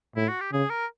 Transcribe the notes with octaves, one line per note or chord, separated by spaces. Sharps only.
A2 E4
F#4
G4
C#3 G#4
A#4